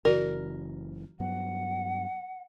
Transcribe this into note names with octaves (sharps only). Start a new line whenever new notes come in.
F#1 C#3 E3 F#4 A#4 D5
G2 F#3 B3 F#5